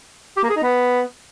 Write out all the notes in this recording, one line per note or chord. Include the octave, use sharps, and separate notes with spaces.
G4
A#3
G#4
D#4
B3